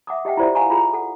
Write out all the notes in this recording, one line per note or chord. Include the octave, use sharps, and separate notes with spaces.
E5 F#5 D6 D#6
G4 D#5 E5 F#5 G5
E4 F4 G4 C5 D5 E5
F5 F#5 G#5 A#5 C#6
F4 G#4 A#5
A4 F#5